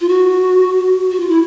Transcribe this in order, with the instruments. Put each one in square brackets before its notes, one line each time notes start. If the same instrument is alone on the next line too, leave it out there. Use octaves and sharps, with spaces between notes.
[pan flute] F4
F#4
F#4
F4
E4